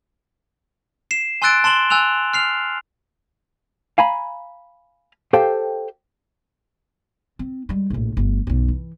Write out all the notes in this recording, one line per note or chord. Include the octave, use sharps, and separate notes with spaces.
C7 E7
G#5 C6 E6 F#6 A6 D7
A5 C6 E7 F#7 G7
G#5 E6 F#6 F7
F6 C7 F7
F5 G#5 A#5 B5
G4 A4 C5 F5 G5
C4
G3 G#3
A#1 A2
G1 A3
B1 F#2
E3